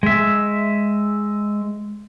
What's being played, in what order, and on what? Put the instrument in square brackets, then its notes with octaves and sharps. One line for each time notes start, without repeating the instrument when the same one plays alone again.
[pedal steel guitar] G#3 E5